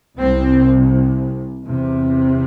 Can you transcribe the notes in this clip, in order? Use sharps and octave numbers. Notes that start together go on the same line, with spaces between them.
C2 C3 C4
E2 C3